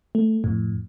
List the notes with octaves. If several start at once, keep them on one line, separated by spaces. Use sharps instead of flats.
A3
F2 A2